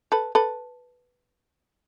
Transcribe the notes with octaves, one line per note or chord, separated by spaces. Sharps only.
A4 B4
A4 B4